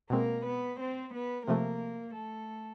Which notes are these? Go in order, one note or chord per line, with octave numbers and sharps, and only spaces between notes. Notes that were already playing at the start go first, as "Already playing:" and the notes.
B2 G#3 A#3 C4 A#4
B3 B4
C4 C5
B3 B4
C3 F3 A3 A#3 A#4
A3 A4